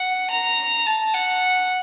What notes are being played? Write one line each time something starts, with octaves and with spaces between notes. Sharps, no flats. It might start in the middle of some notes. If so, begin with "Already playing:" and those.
Already playing: F#5
A#5
A5
F#5